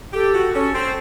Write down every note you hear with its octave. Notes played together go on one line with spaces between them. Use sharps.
G4 A4
F#4
C#4 A4
C4